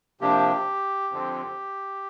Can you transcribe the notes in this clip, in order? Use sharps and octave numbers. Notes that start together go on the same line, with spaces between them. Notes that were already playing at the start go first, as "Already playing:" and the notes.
C3 F3 A#3 D4 G4
F2 D3 F3 C4